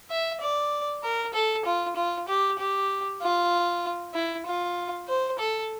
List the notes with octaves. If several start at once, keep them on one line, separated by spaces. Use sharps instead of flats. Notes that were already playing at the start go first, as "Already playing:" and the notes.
E5
D5
A#4
A4
F4
F4
G4
G4
F4
E4
F4
C5
A4